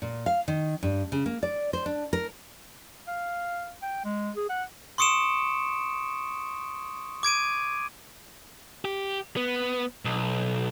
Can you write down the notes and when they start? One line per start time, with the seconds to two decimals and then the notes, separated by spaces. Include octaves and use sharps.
0.02 A#2
0.26 F5
0.48 D#3
0.83 G2
1.12 C#3
1.26 A#3
1.43 D5
1.73 C5
1.86 D4
2.13 A#4
3.07 F5
3.83 G5
4.05 G#3
4.36 G#4
4.50 F#5
4.98 C6 C#6 D#6 C#7 D7 E7
7.23 D6 G#6 D7 D#7
8.85 G4
9.37 B3
10.05 B1